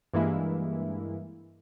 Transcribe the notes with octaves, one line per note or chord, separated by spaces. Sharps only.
G2 E3 G#3 A#3 E4